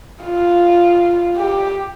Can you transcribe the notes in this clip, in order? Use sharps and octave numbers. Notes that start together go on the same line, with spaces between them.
F4
G4